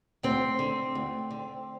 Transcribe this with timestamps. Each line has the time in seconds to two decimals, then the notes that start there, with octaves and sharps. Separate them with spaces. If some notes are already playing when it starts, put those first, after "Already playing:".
0.23 D2 C4
0.59 D3
0.95 D2
1.30 D3